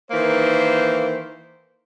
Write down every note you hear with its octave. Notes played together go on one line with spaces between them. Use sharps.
D#3 E3 A#3 C5